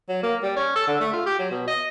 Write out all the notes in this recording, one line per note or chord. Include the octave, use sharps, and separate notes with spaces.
F#3
A#3
G3
C#4
A4
D3
A3
F4
G4
F#3
B2
D#5